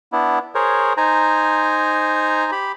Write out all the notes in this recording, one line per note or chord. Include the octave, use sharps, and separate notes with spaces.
B3 D4 E4
G#4 A#4 C5 C#5
D#4 C5 G#5 A#5
G4 B5